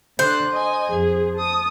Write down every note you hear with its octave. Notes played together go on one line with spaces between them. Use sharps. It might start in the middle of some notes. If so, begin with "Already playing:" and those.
D3 C5 D5 F#6
D#5 G#5
F2 G#4
A5 D#6